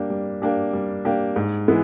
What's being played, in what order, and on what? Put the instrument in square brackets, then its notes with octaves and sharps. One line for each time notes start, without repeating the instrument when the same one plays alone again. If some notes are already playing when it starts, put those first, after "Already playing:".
Already playing: [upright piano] G3 A#3 D4 G4
G3
A#3 D4 G4
G3
A#3 D4 G4
G#2
E3 G#3 B3 E4